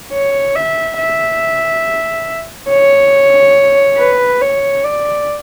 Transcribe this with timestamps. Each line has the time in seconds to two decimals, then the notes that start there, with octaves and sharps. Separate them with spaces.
0.13 C#5
0.55 E5
0.98 E5
2.70 C#5
3.98 B4
4.41 C#5
4.84 D5